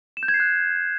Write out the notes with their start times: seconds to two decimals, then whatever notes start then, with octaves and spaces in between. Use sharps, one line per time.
0.17 E7
0.23 G6
0.28 G#6
0.34 C7
0.40 F#6